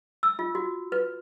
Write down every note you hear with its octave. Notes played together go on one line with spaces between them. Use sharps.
E6
F4
F#4
B4